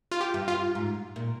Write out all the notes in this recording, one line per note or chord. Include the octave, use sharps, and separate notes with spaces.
F4
G4
G2
F4
G#2
A#2